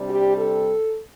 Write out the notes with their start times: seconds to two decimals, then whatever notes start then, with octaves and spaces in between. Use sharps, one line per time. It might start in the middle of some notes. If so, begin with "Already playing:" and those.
Already playing: C3 G3 D4
0.08 G4
0.37 A4